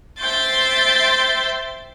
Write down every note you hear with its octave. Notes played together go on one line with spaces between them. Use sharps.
C5 E5 G5 C6 A6